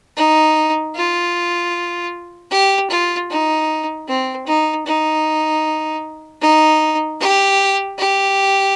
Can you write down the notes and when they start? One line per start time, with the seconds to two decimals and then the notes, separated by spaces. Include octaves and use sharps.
0.17 D#4
0.96 F4
2.51 G4
2.90 F4
3.30 D#4
4.08 C4
4.47 D#4
4.86 D#4
6.42 D#4
7.21 G4
7.99 G4